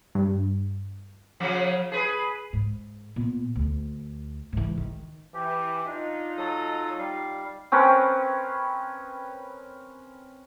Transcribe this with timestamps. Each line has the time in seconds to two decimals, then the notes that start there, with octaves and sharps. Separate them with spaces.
0.15 G2
1.40 C#3 F3 F#3
1.92 G#4 B4
2.53 G#2
3.16 A#2 B3
3.56 D2
4.53 G#2 E3
4.77 D#3
5.34 E3 G4
5.86 D4 D#4 F4
6.38 F#3 A4 D#6
6.99 G3 F5
7.72 C4 C#4 A#4 B4